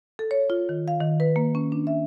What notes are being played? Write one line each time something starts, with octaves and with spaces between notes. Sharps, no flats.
A4
C#5
F4
D#3
F5
D#3
B4
A#3
C#4
D4
E5